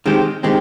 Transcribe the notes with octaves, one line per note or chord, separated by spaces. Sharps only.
D#3 G#3 C4 G4
D#3 G#3 C4 G4